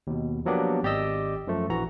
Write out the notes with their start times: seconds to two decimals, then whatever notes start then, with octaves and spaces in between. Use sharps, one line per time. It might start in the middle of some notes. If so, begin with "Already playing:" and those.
0.07 D#2 B2
0.45 F3 F#3 A#3 B3 D4 G4
0.83 G#1 G4 D5 D#5 E6
1.47 F#2 F3 A3
1.69 A#1 E3 F#4 A#5